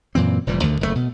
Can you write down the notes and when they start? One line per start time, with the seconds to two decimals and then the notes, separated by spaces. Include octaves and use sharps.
0.15 F#2 A#2 E3 C4
0.47 F1 A#2 E3 G3
0.63 D2 D3 D#3 A3
0.81 F#1 E2 C3 A3
0.95 B2